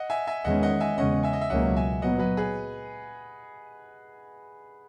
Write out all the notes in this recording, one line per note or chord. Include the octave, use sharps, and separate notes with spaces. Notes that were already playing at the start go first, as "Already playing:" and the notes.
Already playing: D#5 F#5
E5 G#5
E5 G#5
E2 D#3 G#3 C#4 D#5 F#5
D#5 F#5
E5 G#5
E2 C#3 G#3 C#4 D#5 F#5
E5 G#5
D#5
E5
C#2 B2 F#3 A#3 C#4 D#5 F#5
E5 G#5
A#2 F#3 B3 D#5 F#5
B4 D#5
G#4 B4